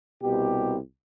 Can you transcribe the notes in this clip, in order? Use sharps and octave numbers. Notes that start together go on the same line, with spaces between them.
C2 B2 G4